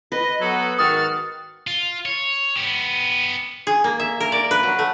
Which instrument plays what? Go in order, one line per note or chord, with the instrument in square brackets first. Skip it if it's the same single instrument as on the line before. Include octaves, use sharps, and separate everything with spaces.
[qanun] B4 [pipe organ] D#5
[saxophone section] F#3 B3 [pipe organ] A4
[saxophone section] G#2 D#3 F#4 [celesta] D#6 [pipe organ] F6 A6
[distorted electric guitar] F4
C#5
B3 G4
[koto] G#4
A#3
E5
A#4
D5
B4
F#3
A3